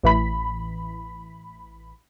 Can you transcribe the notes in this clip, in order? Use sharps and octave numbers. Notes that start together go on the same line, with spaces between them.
A1 E3 B5